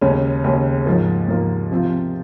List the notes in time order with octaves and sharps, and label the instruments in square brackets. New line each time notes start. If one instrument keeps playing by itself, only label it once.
[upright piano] D#2 C#3 G#3 C#4
D#2 C#3 G#3 C#4
G#2 F3 A#3
G#2 F3 A#3
C3 F3 C4 F4